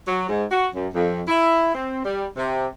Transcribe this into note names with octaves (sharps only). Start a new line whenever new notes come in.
F#3
G#2
F#4
F#2
F2
E4
C4
G3
C3